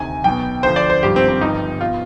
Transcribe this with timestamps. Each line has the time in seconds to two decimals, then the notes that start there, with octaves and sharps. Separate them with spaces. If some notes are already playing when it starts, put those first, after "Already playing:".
Already playing: D2 C3 D#3 G#5
0.24 B1 B2 G5
0.63 D2 D3 F3 C5
0.76 D5
0.90 C5
1.03 G#1 G2 F3 G4
1.16 C4
1.28 C4
1.41 G1 G2 F3 D#4
1.81 B2 F4